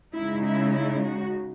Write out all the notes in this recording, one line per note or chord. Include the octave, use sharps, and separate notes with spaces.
C#3 G#3 D#4 E4
E4
E4
F#4